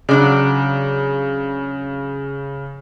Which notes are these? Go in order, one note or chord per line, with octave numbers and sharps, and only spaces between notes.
C#3 F#3 D4 D5